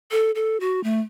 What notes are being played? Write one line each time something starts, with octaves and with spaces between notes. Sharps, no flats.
A4
A4
F#4
A3